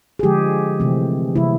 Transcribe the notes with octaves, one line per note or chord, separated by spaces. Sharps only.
G#4
D3 F3 G#3 G4
C3 E3 A3 C4
C3 E3 G3 A#3 E4